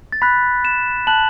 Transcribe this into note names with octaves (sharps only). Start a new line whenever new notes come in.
A6
B5 F#6 B6
E7
A5 F#6 F#7